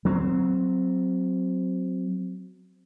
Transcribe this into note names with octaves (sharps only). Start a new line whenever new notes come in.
F#3 C4